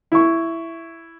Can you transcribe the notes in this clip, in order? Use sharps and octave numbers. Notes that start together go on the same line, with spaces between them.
E4 C#6